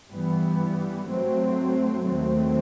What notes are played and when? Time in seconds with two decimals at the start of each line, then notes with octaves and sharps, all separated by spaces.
0.10 G2 E3 G3 B3
1.07 G2 F#3 A3 C4
2.05 D#2 D#3 F#3 A3 C4